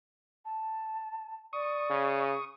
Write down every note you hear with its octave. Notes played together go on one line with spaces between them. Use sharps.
A5
D5 C#6 D#6
C#3